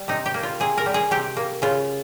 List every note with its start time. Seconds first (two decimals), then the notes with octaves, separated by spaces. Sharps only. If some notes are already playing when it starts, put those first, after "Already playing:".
Already playing: G3
0.08 C3 D#4
0.26 G4
0.34 A#3
0.43 F4
0.60 C3 G#4
0.77 A#4
0.86 G3
0.94 G#4
1.11 C3 G4
1.37 A#3
1.62 C#3 F4